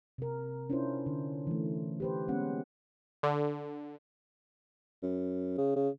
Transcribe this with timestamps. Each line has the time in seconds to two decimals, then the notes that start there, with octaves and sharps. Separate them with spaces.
0.18 C3 A#4
0.70 C#4 D4 E4 F4 C5
1.06 D3
1.47 E3 A3
2.00 G4 B4 C5
2.28 G#3 A#3 B3 C#4 F#5
3.23 D3
5.03 F#2
5.57 C#3
5.76 C#3